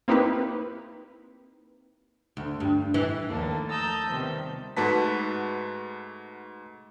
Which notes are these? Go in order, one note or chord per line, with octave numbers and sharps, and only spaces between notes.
A#3 C4 D#4 E4 G4 B4
D2
G2
E3
D#2 F3 A3 A#3 D4 A4
A5 A#5 D#6 E6 G6
C3 D#3 F3 G3 B3
G#2 A3 F#4 B4 A5 B6